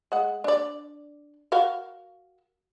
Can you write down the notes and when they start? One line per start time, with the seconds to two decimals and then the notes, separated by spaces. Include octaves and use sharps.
0.12 G#3 F#5
0.44 D4 D5
1.52 F#4 A#4 F5